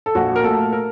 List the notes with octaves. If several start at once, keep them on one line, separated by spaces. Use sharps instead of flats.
A4
A#1 F#4
A#4
A#2 A3 A4
A#4